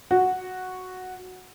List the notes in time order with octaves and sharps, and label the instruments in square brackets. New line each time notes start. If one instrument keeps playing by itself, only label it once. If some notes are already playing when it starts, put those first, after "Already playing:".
[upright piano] F#4